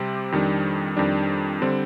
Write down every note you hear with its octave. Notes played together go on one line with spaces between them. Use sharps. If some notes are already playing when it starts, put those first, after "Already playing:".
Already playing: C3 G3 C4 G4
F2 D#3 G3 D4
F2 D#3 G3 D4
D3 G3 C4